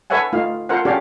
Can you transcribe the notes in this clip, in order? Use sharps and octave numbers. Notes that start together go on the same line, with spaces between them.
A4 B4 C#5 E5 F#5 G#5
A3 D#4 F4 F5
F4 A4 A#4 C5 F5 F#5
C#4 F#4 G4 A4 D5 F5